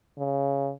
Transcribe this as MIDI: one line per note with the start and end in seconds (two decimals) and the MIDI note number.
0.18 0.72 49